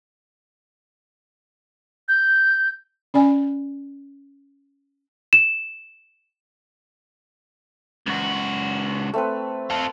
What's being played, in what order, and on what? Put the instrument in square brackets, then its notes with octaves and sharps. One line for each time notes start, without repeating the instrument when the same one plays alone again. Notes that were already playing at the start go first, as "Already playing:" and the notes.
[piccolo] G6
[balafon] C#4 D5 G#5
[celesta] E7
[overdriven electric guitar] C#2 F#4
[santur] A3 C4 B4
[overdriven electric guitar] F4 A4